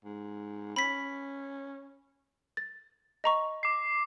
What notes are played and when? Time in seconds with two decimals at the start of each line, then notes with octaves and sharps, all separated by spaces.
0.04 G#2
0.76 C#4 B5 B6
2.57 A6
3.24 D#5 A#5 C#6
3.63 D6 C7